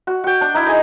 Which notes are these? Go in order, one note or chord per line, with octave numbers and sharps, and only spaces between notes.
F#4
F#4 G5
D4
D#4 E4
G#4 D#5